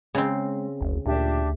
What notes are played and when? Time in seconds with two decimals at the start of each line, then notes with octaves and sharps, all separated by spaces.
0.15 C#3 G#3 C4
0.81 F#1 D2
1.06 D2 A#2 D4 G4 E5